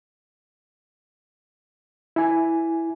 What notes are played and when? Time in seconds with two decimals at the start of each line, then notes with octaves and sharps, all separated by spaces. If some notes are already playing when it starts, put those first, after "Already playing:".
2.16 E4 G#5